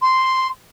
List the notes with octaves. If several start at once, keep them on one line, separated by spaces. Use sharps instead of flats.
C6